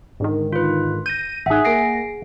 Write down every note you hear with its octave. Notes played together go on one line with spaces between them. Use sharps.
G#2 D3 D#3
F4 B4
G6 A#6 D#7
A1 D#4 G#4 E5 F#5
A#3 A#6 C7 D7